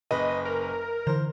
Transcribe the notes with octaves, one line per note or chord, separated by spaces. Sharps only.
F#1 B4 D#5
A#4
D3 E3 C5